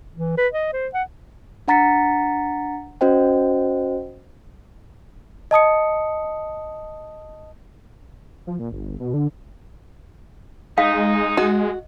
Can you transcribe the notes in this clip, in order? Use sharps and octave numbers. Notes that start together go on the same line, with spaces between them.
E3
B4
D#5
C5
F#5
D4 F#5 A#5 A6 B6 C#7
C#4 F#4 C5 D#5 G5
D#5 A5 D#6 C#7
F3
A#2
G1
B2
D3
G#3 D#4 F5
F#4 D#5